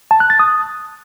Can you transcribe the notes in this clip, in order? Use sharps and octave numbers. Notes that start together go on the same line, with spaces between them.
A5
F#6
A6
D#6